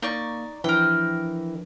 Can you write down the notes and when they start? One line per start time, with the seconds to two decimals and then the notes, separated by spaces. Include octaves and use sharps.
0.02 A#3 D#4 D5 C#6
0.64 E3 F3 D4 A#4 G5